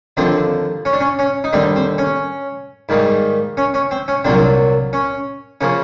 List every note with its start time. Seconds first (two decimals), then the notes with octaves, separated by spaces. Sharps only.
0.17 D#2 D3 F3 C4 D4
0.85 C#4
0.93 D4
1.01 C#4
1.19 C#4
1.44 D#4
1.53 D#2 D3 G3 C4 D4
1.76 C4
1.98 C#4
2.89 G#2 D#3 G3 A#3
3.57 C#4
3.74 C#4
3.91 C4
4.08 C#4
4.24 C2 A#2 F#3 A#3 C4 D4
4.93 C#4
5.61 C#3 F3 A#3 C#4